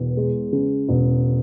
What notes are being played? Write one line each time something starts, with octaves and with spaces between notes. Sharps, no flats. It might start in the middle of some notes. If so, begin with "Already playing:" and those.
Already playing: E1 E2
G#3
C#3
E1